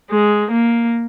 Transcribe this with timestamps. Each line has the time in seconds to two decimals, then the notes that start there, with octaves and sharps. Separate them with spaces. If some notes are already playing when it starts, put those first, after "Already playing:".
0.11 G#3
0.51 A#3